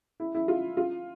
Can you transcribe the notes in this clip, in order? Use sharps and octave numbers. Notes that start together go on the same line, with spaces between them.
E4
E4
F4
F4